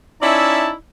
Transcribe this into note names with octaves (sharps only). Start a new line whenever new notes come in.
C#4 D#4 E4 D5 E5 A5